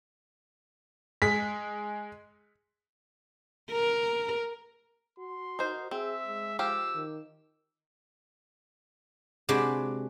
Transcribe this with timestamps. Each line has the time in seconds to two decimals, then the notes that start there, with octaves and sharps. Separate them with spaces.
1.22 G#3 G#4 B6
3.72 A#4
5.19 F#4 C6
5.59 D#4 A#4 C5
5.91 C4 G#4 E5
6.27 G#3
6.59 F3 G4 F5 E6
6.94 D#3
9.49 C3 G#3 D4 F#4 B4 C5